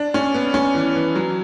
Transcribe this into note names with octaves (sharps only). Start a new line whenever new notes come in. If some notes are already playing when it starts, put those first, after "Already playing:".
Already playing: D4
C#4
B3
C#4
E3
E3
F#3